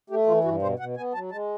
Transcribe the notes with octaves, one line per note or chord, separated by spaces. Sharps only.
A3 G4
E3 F4
G2 F#4
B2 C5
B2 F#5
B3 G#5
F#3 A5
G#3 A5